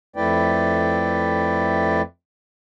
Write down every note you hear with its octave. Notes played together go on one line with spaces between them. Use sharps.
F2 A3 E4 B4 D5 G5